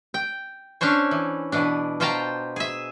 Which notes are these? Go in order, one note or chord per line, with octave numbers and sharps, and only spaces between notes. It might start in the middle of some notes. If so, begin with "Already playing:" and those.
G5
C#4 D4 A4 C5 C#5
E3
B2 E3 D4
B2 F4 C5 G5 A5 A#5
G#4 E5